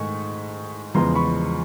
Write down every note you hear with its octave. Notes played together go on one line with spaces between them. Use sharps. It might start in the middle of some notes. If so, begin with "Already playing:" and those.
Already playing: G#2 D#3 A3 C#6
E2 C#3 F3 G#3 B3 A#5 C6
B5 C#6